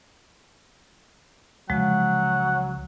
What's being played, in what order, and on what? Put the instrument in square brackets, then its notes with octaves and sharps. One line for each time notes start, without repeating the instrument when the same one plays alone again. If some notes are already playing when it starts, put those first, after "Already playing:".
[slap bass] C#2 C3 [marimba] F3 G#3 [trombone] F#3 [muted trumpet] F#5